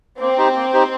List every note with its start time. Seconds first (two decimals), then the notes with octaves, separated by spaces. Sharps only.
0.20 A#3 C4
0.38 D#4 G4 C5
0.55 A#3
0.73 D#4 G4 C5